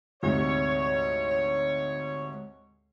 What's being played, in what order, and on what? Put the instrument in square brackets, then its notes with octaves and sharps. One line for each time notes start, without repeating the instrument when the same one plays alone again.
[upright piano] D2 G#2 C3 [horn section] C#5